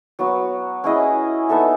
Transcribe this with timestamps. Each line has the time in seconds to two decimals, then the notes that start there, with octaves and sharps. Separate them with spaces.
0.19 F#3 B3 F#4
0.84 C#4 E4 G#4 D#5
1.49 B3 D#4 A4 E5